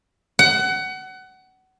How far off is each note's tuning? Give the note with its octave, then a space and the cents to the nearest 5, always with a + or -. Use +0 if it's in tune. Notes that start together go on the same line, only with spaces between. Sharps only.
F#5 +25